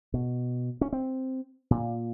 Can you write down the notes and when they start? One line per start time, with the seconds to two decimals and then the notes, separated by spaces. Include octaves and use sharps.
0.14 B2
0.81 C#4
0.93 C4
1.71 A#2